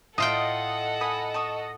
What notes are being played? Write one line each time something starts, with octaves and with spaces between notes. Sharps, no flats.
A2 F4 A4 D#5 F#5 G5 D#6
G#5 B5 D#6
A5 C#6 D#6